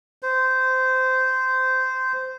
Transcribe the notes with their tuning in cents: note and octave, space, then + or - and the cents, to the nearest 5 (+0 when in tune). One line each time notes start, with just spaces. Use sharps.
C5 -15